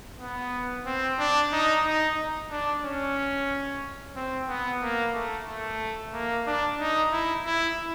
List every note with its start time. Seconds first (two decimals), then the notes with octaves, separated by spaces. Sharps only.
0.20 B3
0.86 C4
1.19 D4
1.52 D#4
1.85 D#4
2.51 D4
2.85 C#4
4.16 C4
4.48 B3
4.82 A#3
5.15 A3
5.48 A3
6.14 A#3
6.47 D4
6.80 D#4
7.12 E4
7.45 E4